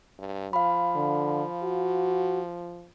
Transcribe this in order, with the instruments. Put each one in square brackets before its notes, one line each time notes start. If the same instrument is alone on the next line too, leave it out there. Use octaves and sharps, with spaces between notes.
[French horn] G2
[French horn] F3 [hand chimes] F5 B5
[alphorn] D3
F#4